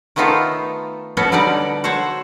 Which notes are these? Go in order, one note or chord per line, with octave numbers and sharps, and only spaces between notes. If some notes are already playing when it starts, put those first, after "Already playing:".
D#3 A3 B3 D#4 F4 A4
B2 B3 C#4 F#4 A4
D3 G3 D#4 D5 F#5
F#4 A4 C5 C#5